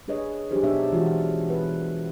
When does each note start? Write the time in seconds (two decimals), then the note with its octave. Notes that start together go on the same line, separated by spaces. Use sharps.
0.08 D4 G#4 B4 C#5 D#5
0.51 F#3 D4 D#4 G4 G#4 C5
0.63 B2 B3 D4 C#5 E5
0.92 E3 G#3 F4 F#4
1.50 B3 B4